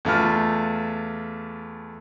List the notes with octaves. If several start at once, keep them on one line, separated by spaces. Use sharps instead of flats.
E2 A3 F4 F6